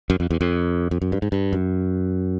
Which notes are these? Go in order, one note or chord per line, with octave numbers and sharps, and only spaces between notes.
F#2
F2
E2
F2
F2
F#2
G2
G#2
G2
F#2